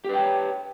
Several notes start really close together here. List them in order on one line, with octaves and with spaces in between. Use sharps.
G4 B4 G5 C#5